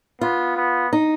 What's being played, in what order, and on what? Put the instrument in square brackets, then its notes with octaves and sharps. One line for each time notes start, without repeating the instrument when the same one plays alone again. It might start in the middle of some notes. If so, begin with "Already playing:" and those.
[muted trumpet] B3 [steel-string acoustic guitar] F4
[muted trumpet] B3
[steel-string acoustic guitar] D#4